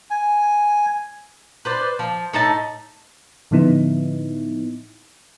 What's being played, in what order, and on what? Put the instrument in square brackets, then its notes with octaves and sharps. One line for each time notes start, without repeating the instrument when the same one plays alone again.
[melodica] G#5
[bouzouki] B4 C5 D5
F3
A2 D#4 E5 A5
[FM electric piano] A2 D3 F3 B3 D#4 E4